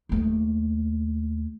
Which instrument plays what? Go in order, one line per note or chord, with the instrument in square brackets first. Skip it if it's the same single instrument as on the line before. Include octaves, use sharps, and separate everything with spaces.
[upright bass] D#2 A3